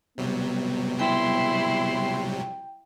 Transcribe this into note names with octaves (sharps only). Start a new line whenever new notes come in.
C3 F#3 G3 B3
E4 G5 C6